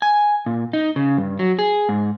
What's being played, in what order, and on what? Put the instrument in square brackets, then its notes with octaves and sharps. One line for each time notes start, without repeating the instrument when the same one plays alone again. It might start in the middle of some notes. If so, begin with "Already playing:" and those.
[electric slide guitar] G#5
A#2
D#4
C#3
G2
F#3
G#4
G#2